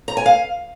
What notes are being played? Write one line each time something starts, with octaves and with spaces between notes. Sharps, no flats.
A#5
G#5
F5